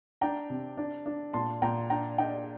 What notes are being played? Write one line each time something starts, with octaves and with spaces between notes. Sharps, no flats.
D4 G5 A#5
C3
D4
D4
A#2 A5 C6
A#2 G5 A#5
D4 G5 A#5
D4 D#5 G5